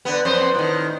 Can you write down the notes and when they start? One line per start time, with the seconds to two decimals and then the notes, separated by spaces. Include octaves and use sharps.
0.05 D3 B3
0.25 F2 B3 C5
0.55 A2 D#3